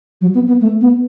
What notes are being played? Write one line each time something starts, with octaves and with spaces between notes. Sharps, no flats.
F#3
B3
B3
A3
B3